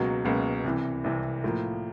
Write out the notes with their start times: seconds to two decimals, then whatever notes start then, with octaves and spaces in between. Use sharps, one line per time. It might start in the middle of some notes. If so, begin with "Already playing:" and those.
Already playing: C#2 B2 F#3 A#3
0.25 C#2 B2 F#3 A#3
0.64 C2 C3 E3
1.04 C2 C3 E3
1.44 A2 F3 A#3